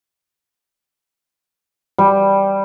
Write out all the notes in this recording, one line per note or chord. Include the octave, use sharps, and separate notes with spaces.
G3